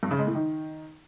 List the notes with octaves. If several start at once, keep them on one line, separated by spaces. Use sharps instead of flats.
G2
C#3
G#3
A2
D#3